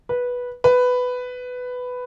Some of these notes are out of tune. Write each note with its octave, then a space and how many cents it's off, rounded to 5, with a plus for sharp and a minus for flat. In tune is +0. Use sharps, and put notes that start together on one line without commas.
B4 -10
B4 +10